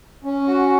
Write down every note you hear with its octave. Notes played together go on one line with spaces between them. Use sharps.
C#4
F#4